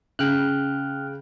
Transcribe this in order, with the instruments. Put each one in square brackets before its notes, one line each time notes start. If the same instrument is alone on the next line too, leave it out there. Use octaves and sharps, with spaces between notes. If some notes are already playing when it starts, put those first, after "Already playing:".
[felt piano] C#3 [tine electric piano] G5 F6 F#6